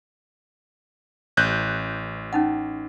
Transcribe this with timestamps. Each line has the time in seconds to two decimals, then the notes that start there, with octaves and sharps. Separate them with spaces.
1.37 A1 F#6 G6
2.33 C#4 D#4 F#5